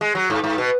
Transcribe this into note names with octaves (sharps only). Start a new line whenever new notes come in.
G#3
F#3
G#2
G#2
B2